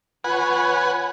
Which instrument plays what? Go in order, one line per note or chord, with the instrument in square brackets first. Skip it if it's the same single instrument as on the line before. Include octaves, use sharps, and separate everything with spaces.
[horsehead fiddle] F4 C#5 [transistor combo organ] B4 F#5 G#5